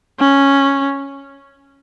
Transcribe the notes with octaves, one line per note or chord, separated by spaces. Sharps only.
C#4